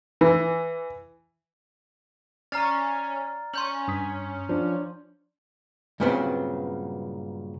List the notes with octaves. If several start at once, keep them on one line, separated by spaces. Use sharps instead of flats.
E3
C#4 D5 A#5 F6 A6 C7
C#4 C6 G6 F#7
G2 D#6 B6
F3 D4
G2 A#2 C#3 F#3 B3 C4